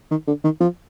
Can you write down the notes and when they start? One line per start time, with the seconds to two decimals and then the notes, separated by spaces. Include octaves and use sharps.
0.11 D#3
0.27 D3
0.44 D#3
0.61 F3